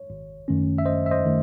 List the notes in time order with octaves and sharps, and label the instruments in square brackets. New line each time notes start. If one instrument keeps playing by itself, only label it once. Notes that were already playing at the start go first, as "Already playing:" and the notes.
Already playing: [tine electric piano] C#5
G#1
F#2 D#3 A3 C#4
E5
G#1 C5 D#5
E5
C5 D#5
D#3 A3